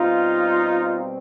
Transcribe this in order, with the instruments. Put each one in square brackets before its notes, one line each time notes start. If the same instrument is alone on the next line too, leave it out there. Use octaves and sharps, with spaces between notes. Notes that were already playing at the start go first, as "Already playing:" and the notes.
Already playing: [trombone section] B2 G3 C4 D#4 F4